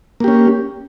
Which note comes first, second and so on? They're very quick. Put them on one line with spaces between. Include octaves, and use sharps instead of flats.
A#3 G4 C#4